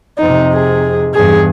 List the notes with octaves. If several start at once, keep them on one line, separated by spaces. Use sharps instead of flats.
F2 C3 D#4
G#4
E2 G2 G#4